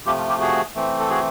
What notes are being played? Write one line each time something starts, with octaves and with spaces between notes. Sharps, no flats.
C3 F3 A3 F4 G4
F4
F4 G4
F#4 G#4
E3 A3 C4
A4
F#4 G#4